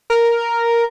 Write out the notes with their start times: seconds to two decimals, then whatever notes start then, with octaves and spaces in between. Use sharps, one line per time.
0.10 A#4